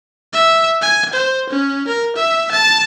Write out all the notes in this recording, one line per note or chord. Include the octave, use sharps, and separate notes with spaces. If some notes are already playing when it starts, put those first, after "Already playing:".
E5
G#5
C5
C#4
A#4
E5
A5